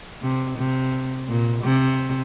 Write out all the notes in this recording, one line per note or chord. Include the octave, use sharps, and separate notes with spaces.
C3
C3
A#2
C3